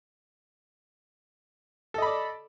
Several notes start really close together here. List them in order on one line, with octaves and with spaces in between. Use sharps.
A4 D#5 B5 D5